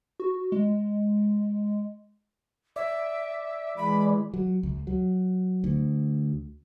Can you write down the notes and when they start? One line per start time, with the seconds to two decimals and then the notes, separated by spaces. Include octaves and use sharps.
0.20 F#4
0.52 G#3
2.76 D5 E5
3.77 E3 G#3 B5
4.34 F#3
4.63 C#2
4.87 F#3
5.64 D2